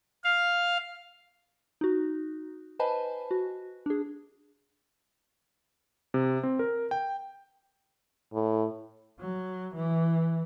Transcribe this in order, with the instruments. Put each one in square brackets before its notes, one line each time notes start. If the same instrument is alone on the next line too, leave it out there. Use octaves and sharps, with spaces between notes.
[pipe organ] F5
[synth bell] D#4 F#4
B4 C5 D#5 G#5 A5 B5
F#4
D4 G#4
[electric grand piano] C3
C4
A#4
G5
[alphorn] A2
[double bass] F#3
E3